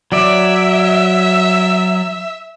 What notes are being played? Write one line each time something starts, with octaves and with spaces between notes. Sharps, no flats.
F#3 D5 E5